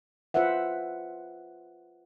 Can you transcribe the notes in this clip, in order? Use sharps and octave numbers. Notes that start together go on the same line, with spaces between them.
F4 B4 C5 E5 F#5